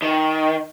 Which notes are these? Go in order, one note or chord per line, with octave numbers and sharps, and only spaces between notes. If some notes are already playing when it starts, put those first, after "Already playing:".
D#3